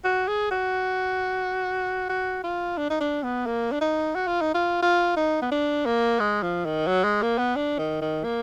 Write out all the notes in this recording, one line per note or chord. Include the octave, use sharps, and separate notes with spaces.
F#4
G#4
F#4
F#4
F4
D4
D#4
D4
B3
A#3
D4
D#4
F#4
F4
D#4
F4
F4
D#4
B3
D4
A#3
G#3
F3
D#3
F#3
G#3
A#3
B3
D4
D#3
D#3
A#3